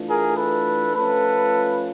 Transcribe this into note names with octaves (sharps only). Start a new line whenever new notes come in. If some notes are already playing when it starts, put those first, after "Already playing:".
Already playing: E3 A3 D4 F4
G#4 A#4
A4 B4
F3 A3 C#4 F4 A4 B4